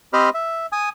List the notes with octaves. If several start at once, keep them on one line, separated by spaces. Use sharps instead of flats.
C4 G4 C5 D#5 B5 F6
E5
G#5 D#6